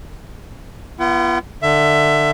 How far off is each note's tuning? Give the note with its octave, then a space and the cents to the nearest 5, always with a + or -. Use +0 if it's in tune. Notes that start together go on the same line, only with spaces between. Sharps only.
B3 -20 F4 -40 F#5 +35
D3 +25 E5 +20